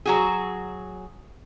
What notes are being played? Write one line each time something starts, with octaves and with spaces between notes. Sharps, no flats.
F#3 F#4 G#4